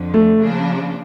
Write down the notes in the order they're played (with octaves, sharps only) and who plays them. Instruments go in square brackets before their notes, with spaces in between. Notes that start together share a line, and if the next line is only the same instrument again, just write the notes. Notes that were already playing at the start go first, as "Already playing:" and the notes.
Already playing: [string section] F2 D3 F3
[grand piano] A3
[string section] C#3 F3 A#3 D4